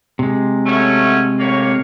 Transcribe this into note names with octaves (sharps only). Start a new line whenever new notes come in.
C3 G#3
F#3 A3 C#4
A2 A#3 C#5